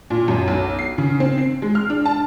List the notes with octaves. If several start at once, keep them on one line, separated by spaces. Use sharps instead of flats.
A#2
F#2
B1
C7
C#3
C4
C7
G#3
F6
D4
A5